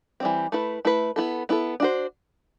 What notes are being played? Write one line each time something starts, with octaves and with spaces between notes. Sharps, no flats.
E3 G3 C4
A3 E4 B4
A3 E4 B4
B3 E4 A4
B3 E4 A4
D4 F#4 C5